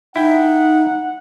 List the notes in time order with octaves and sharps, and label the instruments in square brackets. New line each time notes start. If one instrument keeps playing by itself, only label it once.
[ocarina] D#4 [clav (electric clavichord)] E4 G5 [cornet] F#5